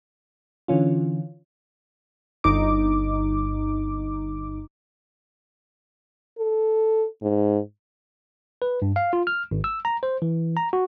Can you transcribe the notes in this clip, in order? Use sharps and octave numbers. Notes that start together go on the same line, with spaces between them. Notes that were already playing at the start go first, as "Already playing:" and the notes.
D3 E3 C#4 F4
G1 D#4 D6
A4
G#2
B4
G2
F5
F4
F6
G#1
E6
A#5
C5
E3
A#5
F#4